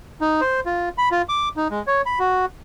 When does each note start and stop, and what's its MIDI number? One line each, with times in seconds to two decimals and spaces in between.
0.21 0.41 63
0.41 0.60 72
0.66 0.89 65
0.98 1.09 83
1.11 1.22 65
1.29 1.49 86
1.57 1.68 63
1.71 1.82 56
1.87 2.02 73
2.06 2.19 83
2.19 2.46 66